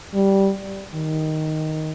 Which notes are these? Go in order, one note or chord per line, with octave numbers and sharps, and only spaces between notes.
G3
D#3